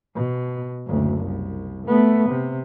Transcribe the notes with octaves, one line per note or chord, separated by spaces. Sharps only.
B2
F#1 D2
C2
A3 B3
C3